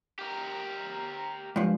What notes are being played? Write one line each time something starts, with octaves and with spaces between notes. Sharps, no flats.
G4 A#4
G2 F3 G#3